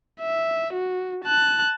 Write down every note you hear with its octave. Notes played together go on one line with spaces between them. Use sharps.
E5
F#4
A5 F#6